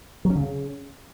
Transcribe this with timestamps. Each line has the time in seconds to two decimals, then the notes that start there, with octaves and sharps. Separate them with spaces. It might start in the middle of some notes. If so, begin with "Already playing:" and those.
0.25 F#3
0.30 C#4
0.35 D3
0.40 C#3